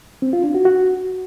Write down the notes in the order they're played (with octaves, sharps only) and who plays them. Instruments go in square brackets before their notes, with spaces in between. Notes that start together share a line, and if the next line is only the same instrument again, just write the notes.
[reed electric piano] C4
F4
D4
F#4
F#4